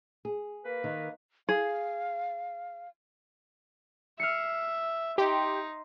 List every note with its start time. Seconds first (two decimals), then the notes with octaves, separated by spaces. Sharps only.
0.25 G#4
0.65 A#3 B4
0.84 D#3
1.49 G#4 F5
4.20 E5 F6 C7 C#7
5.18 D#4 G4 C6